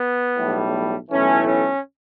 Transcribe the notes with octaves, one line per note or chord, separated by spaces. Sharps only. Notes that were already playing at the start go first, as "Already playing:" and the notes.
Already playing: B3
B1 A2 G3
B1 A2 E3 A3 C#4
C#4